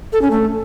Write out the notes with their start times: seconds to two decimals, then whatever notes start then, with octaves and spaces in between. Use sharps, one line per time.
0.13 A4
0.22 C#4
0.31 A3